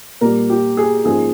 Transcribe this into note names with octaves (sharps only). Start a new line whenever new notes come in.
A#2 G3 A#3 A#4
G4
G#4
G#2 F3 A#3 C#4 G#4